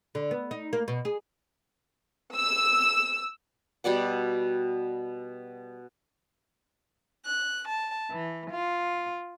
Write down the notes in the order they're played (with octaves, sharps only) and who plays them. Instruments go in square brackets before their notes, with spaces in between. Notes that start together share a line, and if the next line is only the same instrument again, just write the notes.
[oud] D3
B3
D#4
A#3
B2
G#4
[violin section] E6
[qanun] B2 G3 D5 F#5
[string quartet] F#6
A5
E3
F4